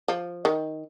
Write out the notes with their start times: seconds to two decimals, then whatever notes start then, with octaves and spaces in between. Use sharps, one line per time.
0.08 F3
0.45 D#3